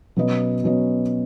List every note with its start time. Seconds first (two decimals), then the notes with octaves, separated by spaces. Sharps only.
0.16 B2 F#3 C#4 B4 D#5
0.64 B2 F#3 C#4 B4 D#5